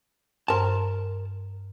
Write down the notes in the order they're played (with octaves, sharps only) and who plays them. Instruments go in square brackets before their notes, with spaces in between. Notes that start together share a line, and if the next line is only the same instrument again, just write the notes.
[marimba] G2 C5 C6 [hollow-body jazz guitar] A#4 A5